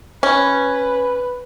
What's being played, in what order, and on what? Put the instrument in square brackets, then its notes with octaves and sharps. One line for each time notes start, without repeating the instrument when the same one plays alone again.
[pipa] C#4 [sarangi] B4